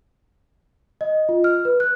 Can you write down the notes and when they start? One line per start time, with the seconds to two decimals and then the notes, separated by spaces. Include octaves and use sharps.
1.01 D#5
1.29 F4
1.44 F6
1.65 B4
1.80 F#6